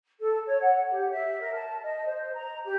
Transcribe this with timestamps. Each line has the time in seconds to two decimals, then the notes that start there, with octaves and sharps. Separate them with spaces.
0.20 A4
0.47 C#5
0.61 F#5
0.91 G4
1.11 E5
1.40 A#4
1.53 A5
1.83 D#5
2.07 C5
2.34 A#5
2.64 G4